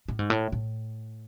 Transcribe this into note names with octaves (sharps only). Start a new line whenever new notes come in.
A2
G#2
A2
A2